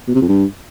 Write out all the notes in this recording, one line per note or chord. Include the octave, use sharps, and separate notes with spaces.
B2
C3
F2
G2